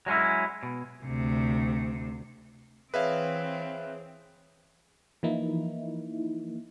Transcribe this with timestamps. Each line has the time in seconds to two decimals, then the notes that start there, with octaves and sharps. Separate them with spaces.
0.06 F#3 G#3 C#4 E4
0.63 B2
1.05 D2 C3
2.94 E3 C4 G#4 B4 C#5 E5 F5
5.23 E3 F3 A#3 D#4 E4